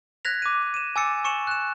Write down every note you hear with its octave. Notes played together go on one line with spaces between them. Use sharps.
F#6 G#6 A#6 B6 F7
D6 D#7
D#7 E7
G#5 D6 E6 A6 C#7
C#6 C#7 E7 F#7
F#6 E7